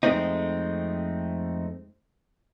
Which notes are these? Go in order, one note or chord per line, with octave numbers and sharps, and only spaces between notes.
F2 G#3 A3 C4 D#4